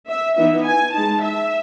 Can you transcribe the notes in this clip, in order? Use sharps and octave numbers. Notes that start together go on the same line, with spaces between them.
E5
E3 B3 D#4 E5
G#5
G#3 D#4 A5
E5